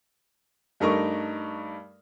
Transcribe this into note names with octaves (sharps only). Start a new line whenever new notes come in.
G2 A3 D#4 A#4 D#5 C#6